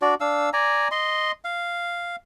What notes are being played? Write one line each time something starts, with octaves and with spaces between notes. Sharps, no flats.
D4 F#4 D5
D4 F5 E6
D5 G#5 A#5
D#5 C6
F5